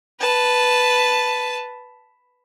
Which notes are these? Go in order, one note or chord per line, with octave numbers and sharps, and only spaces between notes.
B4 A5